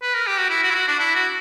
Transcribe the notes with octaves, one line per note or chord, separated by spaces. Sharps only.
B4
A#4
G4
F#4
E4
F#4
E4
F#4
D4
E4
F#4